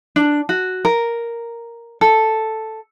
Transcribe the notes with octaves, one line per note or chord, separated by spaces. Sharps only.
D4
F#4
A#4
A4